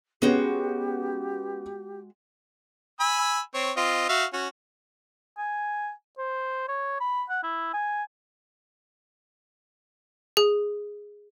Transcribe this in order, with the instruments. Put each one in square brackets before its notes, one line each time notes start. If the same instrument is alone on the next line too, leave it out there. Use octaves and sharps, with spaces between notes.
[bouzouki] G#3 F#4 G5 [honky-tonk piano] B3 C#4 [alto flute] G4
[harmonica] G#5 B5 E6
C4 C#5
C4 F4 D#5
F#4 E5 F5
C#4 F#4
[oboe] G#5
C5
C#5
B5
F#5
E4
G#5
[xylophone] G#4